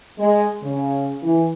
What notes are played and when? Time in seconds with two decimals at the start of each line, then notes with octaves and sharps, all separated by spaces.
0.18 G#3
0.63 C#3
1.23 E3